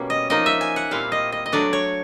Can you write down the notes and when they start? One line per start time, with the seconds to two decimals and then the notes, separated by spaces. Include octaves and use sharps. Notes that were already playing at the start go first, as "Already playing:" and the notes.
Already playing: B2 G3 A#3 C#4
0.10 D#5
0.30 F3 A#3 D#4 D#5
0.46 E5
0.61 G#5
0.76 F#5
0.91 A#2 G3 C4 E4 F5
1.12 D#5
1.32 D#5
1.46 D#5
1.52 F#3 A3 D4 D5
1.73 C#5